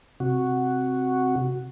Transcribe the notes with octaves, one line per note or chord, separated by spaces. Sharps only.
C3 F#4